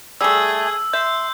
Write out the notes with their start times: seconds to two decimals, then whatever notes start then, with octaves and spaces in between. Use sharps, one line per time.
0.21 G3 A3 G#4 E6
0.93 E5 C6 G6